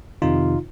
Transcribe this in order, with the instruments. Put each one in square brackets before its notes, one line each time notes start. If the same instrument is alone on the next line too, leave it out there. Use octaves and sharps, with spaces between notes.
[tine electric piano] F2 C3 D#3 D#4 F4